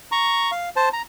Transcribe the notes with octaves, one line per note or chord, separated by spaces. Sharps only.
A#5 C#6
F5
C5 A5
A#5